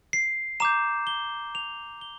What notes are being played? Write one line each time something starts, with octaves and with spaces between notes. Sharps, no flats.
C7
A#5 D6 G6 E7
G7
F7
G7